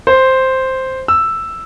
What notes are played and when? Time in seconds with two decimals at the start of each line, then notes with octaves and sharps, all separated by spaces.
0.07 C5
1.08 E6